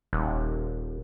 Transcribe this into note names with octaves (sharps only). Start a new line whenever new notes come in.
D#1